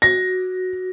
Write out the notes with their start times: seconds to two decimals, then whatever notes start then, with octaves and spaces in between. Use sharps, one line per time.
0.02 F#4 A#6